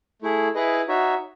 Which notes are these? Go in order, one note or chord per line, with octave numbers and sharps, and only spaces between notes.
A3 E4 G#4
E4 G#4 B4 D#5
D#4 F#4 C#5 E5